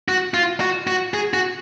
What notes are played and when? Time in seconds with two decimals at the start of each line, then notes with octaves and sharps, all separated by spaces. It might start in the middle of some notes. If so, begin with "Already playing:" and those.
0.09 F#4
0.34 F4
0.60 F#4
0.87 F#4
1.14 G#4
1.34 F#4